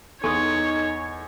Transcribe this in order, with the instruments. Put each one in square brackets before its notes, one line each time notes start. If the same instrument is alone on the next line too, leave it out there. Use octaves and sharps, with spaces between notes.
[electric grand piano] E2 G#5 C#6 [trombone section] D#4 [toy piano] A4 C6 D#6 [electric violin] C#5